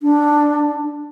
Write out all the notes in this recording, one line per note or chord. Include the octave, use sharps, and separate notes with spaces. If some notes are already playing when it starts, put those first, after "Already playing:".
D4